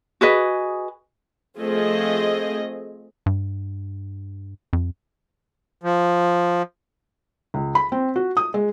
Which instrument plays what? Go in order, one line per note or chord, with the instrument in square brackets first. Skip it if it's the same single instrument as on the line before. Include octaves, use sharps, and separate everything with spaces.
[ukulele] F#4 G#4 B4 D#5
[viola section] F3 A3 C4 G#4 D#5
[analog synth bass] G2
F2
[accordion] F3
[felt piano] C#2
B5
C4
F#4
D#6
G#3